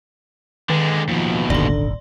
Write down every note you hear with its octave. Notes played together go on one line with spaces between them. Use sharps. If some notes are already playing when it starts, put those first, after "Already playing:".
D3 D#3 G#3
D#2 B2 F3
D#1 G#1 D3 D5 C6